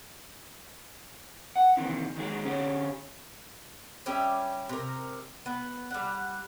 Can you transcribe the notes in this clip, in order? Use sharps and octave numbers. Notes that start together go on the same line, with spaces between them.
F#5
C3 D#3 E3
D#3 F#3 G#3 G#4
D3 C#4 G4 C#5
G3 C#4 G4 E5
C3 A#4
B3
G3 F#5